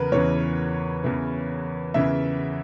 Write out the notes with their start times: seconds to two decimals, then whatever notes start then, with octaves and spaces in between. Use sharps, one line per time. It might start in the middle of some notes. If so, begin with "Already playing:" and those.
Already playing: E2 C#3 A#4 B4
0.12 E2 C#3 E3 C#5
1.04 E2 C#3 E3
1.94 E2 C#3 E3 E5